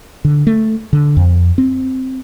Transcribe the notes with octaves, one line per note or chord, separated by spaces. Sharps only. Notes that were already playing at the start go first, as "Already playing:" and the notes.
D3
A3
D3
F2
C4